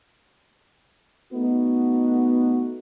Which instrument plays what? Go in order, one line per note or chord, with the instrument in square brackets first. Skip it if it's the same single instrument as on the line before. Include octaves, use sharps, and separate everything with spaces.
[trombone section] A3 B3 D#4 F#4